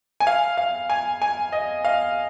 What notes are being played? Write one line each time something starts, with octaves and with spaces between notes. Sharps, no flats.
G#5
F5
F5
G#5
G#5
D#5
F5